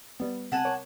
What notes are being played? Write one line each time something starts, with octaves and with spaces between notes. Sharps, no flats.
G3 B3
C3 F#5 G#5 A5
A#4 C#5 D6